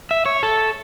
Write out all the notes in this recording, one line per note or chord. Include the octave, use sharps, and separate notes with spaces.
E5
C#5
A4